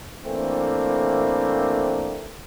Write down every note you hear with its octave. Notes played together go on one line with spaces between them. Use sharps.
E3 A3 A#3 C4 D4